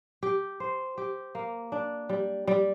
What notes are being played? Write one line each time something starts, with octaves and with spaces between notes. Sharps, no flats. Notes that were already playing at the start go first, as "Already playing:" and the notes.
G4
C5
G4
A#3
D4
G3
G3